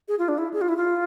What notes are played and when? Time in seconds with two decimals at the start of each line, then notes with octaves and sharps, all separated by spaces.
0.08 G#4
0.19 F4
0.28 D4
0.38 E4
0.53 G#4
0.61 F4
0.69 E4
0.77 F4